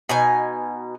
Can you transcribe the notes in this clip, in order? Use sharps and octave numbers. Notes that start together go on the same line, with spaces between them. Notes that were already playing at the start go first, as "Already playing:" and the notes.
B2 D#4 G#5